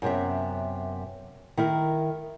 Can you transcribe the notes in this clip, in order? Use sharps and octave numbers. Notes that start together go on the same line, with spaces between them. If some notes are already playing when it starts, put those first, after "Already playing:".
F#2 C3 B3 E5
D#3 E4 A#4